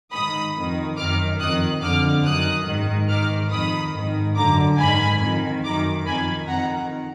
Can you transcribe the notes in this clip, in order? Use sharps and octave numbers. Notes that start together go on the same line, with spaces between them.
G#2 D#3 B5 D#6
F2 D#3
F#2 D#3 D6 F6
F2 D#3 D#6 F#6
F2 D3 D6 F6
F#2 D#3 D#6 F#6
G#2 D#3
G#2 D#3 D6 F6
F2 D#3 B5 D#6
G#2 D#3
F#2 D3 A#5 D6
G#2 D#3 G#5 B5
F2 D#3
F#2 D#3 A#5 D6
F2 D#3 G#5 B5
F2 D#3 F#5 A#5